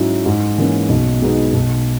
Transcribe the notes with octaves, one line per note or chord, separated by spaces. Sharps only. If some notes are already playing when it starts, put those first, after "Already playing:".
Already playing: G#2 F#3 C#4 E4
G#2
E3 A#3 C#4
B1
B2 G#3 B3 D#4
B1